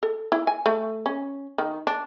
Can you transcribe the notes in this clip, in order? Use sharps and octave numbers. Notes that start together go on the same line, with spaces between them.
A4
E4
G#5
A3
C#4
D#3
D4